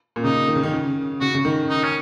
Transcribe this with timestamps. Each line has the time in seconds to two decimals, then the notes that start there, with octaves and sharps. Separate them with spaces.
0.16 A#2
0.24 C#3 D#4
0.48 D#3
0.56 C#3
0.63 D#3
0.72 C#3
1.21 C#3 F#4
1.34 C#3
1.45 D#3
1.70 D#4
1.83 C#4